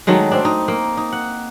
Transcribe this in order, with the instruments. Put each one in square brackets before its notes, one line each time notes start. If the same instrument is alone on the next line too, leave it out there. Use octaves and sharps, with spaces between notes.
[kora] D#3 F#3 G#3 A3
C4 D4
D#4
A#3
D#4
F#5